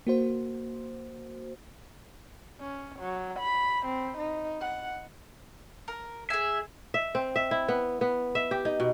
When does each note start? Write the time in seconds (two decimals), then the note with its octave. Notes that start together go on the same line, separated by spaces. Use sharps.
0.07 A#3 F#4 C5
2.60 C#4
2.99 F#3
3.39 B5
3.86 C4
4.18 D#4
4.61 F#5
5.88 A#4
6.30 G#4 E5 G#5
6.94 E5
7.15 C4
7.36 E5
7.51 E4
7.68 B3
8.01 B3
8.35 E5
8.51 G4
8.65 D#4
8.80 B2